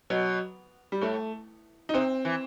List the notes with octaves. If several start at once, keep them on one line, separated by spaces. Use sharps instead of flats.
B2 F#3
G3
A2 A3
D#4
C3 C4
E3